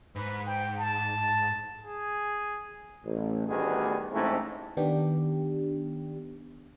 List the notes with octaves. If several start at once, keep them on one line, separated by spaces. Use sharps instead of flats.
G#2 B4
G5
A5
G#4
A1
A1 D2 D#3 G3 B3 G#4
A1 G#2 C#3 E3 A3 C4
D#3 B3 D4 G4